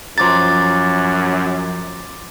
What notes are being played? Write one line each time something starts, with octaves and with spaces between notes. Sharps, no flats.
F#2 F3 A#5 C6 D6 A6